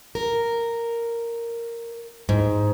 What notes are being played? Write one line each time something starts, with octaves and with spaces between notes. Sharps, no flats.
A#4
G#2